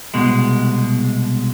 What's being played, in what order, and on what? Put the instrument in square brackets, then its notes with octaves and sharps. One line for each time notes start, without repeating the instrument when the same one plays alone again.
[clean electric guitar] C2 B2 G#3